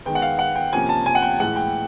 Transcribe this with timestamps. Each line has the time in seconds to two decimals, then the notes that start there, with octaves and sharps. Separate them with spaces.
0.06 D#3 G#3 B3 G5
0.15 F#5
0.22 F5
0.39 F#5
0.56 G5
0.73 C3 F3 A#3 C#4 G#5
0.89 A5
1.06 G#5
1.15 F#5
1.22 G5
1.40 A2 E3 G#3 F#5
1.56 G5